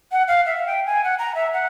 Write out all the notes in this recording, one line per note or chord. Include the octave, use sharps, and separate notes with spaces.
F#5
F5
E5
G5
G#5
F#5
A#5
E5
F#5